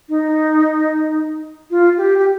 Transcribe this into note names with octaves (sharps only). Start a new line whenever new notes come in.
D#4
F4
G4
G4